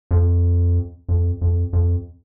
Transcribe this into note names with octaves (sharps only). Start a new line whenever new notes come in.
F2
F2
F2
F2